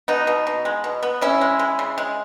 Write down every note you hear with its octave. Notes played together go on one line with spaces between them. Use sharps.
B2 B3 D#4
B2
B2
G#3
B2
B3
C#3 C#4 E4
G#3
G#3
C#3
G#3